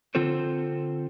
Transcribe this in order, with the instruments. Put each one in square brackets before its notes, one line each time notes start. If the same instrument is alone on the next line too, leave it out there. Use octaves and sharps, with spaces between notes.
[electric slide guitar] D3 C4 F4 A4 C5